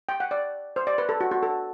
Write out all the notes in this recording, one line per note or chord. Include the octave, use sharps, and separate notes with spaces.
G5
F#5
D5
C5
D5
B4
A4
F#4
F#4
A4